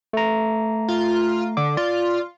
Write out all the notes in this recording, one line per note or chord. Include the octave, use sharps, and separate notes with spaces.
A3 A#5
F4
D3 D6
F4 D5